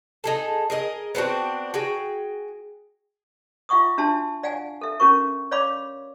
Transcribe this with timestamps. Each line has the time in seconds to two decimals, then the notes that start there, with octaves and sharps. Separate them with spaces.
0.24 D#4 G#4 A4
0.70 G#4 A#4 D#5
1.15 B3 C4 D4 F#4
1.74 F#4 G#4 G5
3.69 F4 E5 F#5 C#6 D#6
3.98 D4 F#4 E5 A5 C6
4.43 D5 F5 F#5 G#5
4.81 A4 E5
5.00 C#4 F#4 A#4 C#6
5.51 C#5 D5 F5 B5 D6